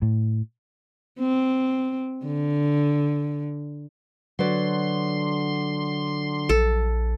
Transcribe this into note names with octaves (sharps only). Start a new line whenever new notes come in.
A2
C4
D3
D3 F#3 B4 D5 C6
A#1 A4